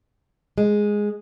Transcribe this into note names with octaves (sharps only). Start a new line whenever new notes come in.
G#3